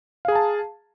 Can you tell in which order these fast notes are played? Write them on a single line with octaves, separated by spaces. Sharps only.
F5 G#4 A#5 A5